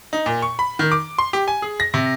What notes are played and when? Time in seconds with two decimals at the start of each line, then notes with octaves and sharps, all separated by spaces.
0.13 D#4
0.26 A#2
0.42 C#6
0.59 B5
0.79 D#3
0.92 D6
1.18 C6
1.33 G4
1.48 G#5
1.62 G#4
1.80 A#6
1.94 C3